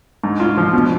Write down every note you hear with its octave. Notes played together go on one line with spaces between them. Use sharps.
G#2
F4
F3
B2